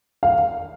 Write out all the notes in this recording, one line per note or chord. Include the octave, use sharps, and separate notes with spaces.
F5